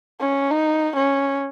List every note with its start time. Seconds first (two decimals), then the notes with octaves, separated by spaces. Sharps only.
0.21 C#4
0.51 D#4
0.96 C#4